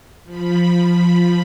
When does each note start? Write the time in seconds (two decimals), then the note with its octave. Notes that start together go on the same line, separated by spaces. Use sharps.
0.24 F3 B5